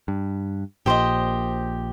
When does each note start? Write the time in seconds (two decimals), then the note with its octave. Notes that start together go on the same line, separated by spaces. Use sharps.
0.08 G2
0.86 A#1 A#2 G4 C5 D#5